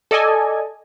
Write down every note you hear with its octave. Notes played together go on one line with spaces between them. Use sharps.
A4 D5 D#5 G#5